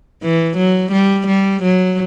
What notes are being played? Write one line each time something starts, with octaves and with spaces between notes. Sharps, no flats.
E3
F#3
G3
G3
F#3